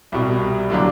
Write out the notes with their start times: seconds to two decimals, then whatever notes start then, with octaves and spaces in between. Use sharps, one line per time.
0.12 C2 B2 G3
0.70 D3 F#3 A#3 D4 G4